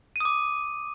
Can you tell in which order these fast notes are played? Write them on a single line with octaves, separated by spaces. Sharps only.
D#7 D#6 D6